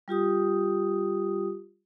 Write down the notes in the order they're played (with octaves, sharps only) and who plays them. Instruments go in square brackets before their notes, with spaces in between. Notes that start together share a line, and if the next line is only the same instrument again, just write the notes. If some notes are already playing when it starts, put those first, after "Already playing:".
[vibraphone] G3 F4 G4 D#6